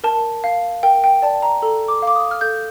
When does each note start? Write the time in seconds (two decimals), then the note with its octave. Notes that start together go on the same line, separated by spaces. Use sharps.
0.04 A#4 A5
0.44 F5
0.83 A#4 G5
1.04 G5
1.22 D5 A5
1.43 A#5
1.62 A4 A#5
1.88 D6
2.02 F5
2.07 D6
2.16 D#6
2.31 F6
2.41 A4 G6